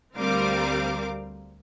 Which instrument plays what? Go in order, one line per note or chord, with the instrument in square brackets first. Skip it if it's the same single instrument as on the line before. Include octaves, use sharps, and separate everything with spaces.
[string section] D2 G3 C4 A#4 F5 D6